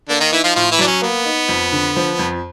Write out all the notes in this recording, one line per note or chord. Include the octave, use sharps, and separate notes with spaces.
D3 A#3 D4
D#3 D#4
E3 D#4 E4
F3 F4
A2 F3 F4
E3 E4
F#3 D4
C#4
A#3 B3
D#4
F2
D3
F3
F2